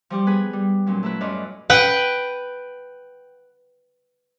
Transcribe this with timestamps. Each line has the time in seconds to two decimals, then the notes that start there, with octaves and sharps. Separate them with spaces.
0.10 F3 G3 G4
0.26 B3 G#4 B4 G#5
0.53 G3
0.86 A#2 F#3 C#4
1.03 A3 E4 B4
1.21 F#2 A2 F4 D5 D#5 D#6
1.70 B4 F#5 G5